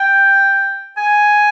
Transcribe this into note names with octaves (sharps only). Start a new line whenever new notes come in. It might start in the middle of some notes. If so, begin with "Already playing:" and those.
Already playing: G5
G#5